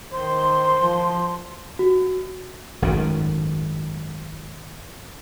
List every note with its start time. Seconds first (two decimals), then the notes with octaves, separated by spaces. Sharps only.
0.13 D#3 C5 C6
0.81 F3
1.79 F#4
2.82 G#1 F#2 A2 D#3